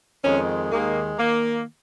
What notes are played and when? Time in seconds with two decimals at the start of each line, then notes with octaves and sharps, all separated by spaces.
0.23 F2 D#3 G#3 C#4
0.71 D#2 D#3 G#3 A#3
1.18 D#3 A#3